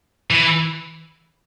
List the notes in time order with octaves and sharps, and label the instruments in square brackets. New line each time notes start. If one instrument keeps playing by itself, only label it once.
[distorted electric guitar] E3